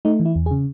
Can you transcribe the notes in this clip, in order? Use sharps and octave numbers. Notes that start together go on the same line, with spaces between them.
A3 D#4
E3
E4
E2
G#4
C#3